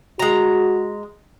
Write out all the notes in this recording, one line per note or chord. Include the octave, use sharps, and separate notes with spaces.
G#3 F#4 A#5